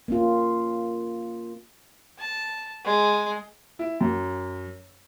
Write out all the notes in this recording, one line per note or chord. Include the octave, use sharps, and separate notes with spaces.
A#3 C#4 F4
A5
G#3
E4
F#2